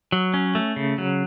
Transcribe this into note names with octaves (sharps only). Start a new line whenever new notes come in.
F#3
C#4
A3
C#3
F#3